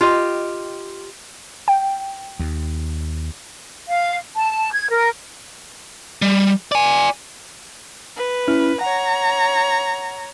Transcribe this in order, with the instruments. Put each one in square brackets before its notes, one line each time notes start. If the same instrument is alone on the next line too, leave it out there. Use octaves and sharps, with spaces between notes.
[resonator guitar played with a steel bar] F4 G4 D#5
[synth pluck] G5
[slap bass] D#2
[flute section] F5
A5
G#6
A#4
[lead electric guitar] G3
D5 G#5
[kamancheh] B4
[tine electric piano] C#4 E4 F6
[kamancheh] C#5 A#5 [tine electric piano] F#5